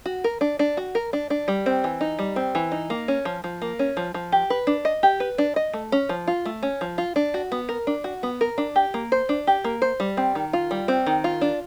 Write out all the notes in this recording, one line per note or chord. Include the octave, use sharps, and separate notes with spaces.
F#4
A#4
D4
D4
F#4
A#4
D4
D4
G3
C4
E3
D#4
G3
C4
E3
D#4
A#3
C#4
F3
F3
A#3
C#4
F3
F3
G4
B4
D4
D#5
G4
B4
D4
D#5
A3
C#4
F3
F4
A3
C#4
F3
F4
D4
F#4
B3
A#4
D4
F#4
B3
A#4
D4
G4
A#3
C5
D4
G4
A#3
C5
G3
C4
D#3
F4
G3
C4
D#3
F4
D4